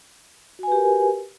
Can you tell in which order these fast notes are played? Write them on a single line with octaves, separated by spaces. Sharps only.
F#4 G#5 B4 G4 A#4